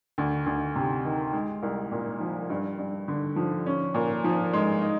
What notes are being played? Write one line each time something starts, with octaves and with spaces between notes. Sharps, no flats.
D2
D2
C3
D#3
G#3
C2
A#2
F3
G2
G2
D3
F3
C#4
A#2
F3
G#3
D#4